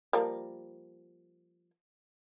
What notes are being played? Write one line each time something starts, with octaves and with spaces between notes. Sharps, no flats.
F3 G3 A#3